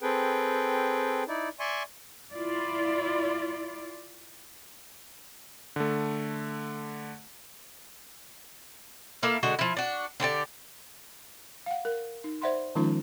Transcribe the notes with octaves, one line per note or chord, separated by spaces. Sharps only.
C4 G#4 A4 B4 G5
D#4 E4 D5
D5 E5 G#5 C6 C#6
E4 F4 D5
D3 A3
A#3 E4 A4 F5
D3 G#3 F#4
F3 E4
D4 F#4
D3 D4 G4 D5
F5 F#5
A#4
D#4
C5 D5 E5 F#5 B5 C6
D#3 F3 G#3 C#4 D#4 F4